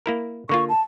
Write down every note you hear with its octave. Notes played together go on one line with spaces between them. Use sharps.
A#3 E4 A#4
D3 A#3 F4 C#6
A5